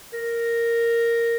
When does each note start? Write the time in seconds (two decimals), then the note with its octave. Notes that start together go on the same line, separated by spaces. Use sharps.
0.14 A#4